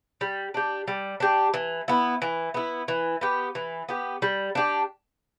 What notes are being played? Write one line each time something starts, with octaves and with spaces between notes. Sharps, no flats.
G3
D4 G4
G3
D4 G4
E3
B3 E4
E3
B3 E4
E3
B3 G4
E3
B3 G4
G3
D4 G4